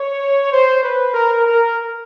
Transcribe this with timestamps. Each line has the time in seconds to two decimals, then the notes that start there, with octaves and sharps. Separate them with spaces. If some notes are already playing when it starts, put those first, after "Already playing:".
Already playing: C#5
0.52 C5
0.84 B4
1.14 A#4
1.46 A#4